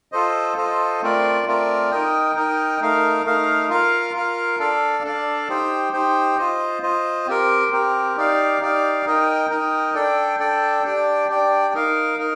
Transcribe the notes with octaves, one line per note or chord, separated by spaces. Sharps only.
F4 A4 C5 D#5
F4 A4 C5 D#5
A3 C4 F4 A#4 D5
A3 C4 F4 A#4 D5
D#4 A#4 D#5 G5
D#4 A#4 D#5 G5
A3 D#4 A#4 F5
A3 D#4 A#4 F5
F4 A#4 F5
F4 A#4 F5
D4 A4 D5 F5
D4 A4 D5 F5
D#4 G4 C5 G5
D#4 G4 C5 G5
F4 C5 D#5
F4 C5 D#5
C4 G4 A#4
C4 G4 A#4
D#4 G4 D5 F5
D#4 G4 D5 F5
D#4 A#4 D#5 G5
D#4 A#4 D#5 G5
D4 A4 D5 G5
D4 A4 D5 G5
D4 G4 D5 G5
D4 G4 D5 G5
D#4 A#4 F5
D#4 A#4